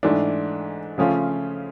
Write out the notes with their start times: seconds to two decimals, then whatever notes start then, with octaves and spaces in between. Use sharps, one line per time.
0.03 G#2 E3 A3 D4
0.98 C#3 F3 A3 C#4 F4